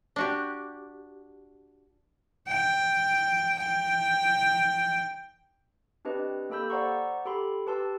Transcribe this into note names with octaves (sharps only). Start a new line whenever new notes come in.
D4 F#4 G4
G5
G5
C4 D4 G4 B4 D#5
A#3 G4 A4 B5 E6 G6
C5 D5 F#5 A#5 C6 C#6
G4 A4 B5 C6
G4 B4 A5 C6 E6